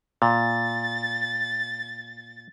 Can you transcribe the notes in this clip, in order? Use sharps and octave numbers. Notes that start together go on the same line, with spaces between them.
A#2 A6